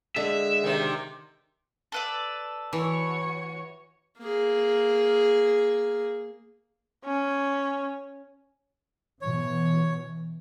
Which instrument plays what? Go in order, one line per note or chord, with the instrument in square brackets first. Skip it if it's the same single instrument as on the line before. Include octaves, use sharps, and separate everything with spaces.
[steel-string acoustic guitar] D3 [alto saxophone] G#3 [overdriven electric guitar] E5
[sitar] C3 D#3
[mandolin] A4 B4 D5
[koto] E3 [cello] F#4 C#5
[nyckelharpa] A#3 G#4
[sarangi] C#4
[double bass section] B2 E3 [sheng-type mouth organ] C#5